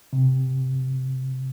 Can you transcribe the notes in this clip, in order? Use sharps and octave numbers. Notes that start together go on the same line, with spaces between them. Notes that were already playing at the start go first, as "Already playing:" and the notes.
C3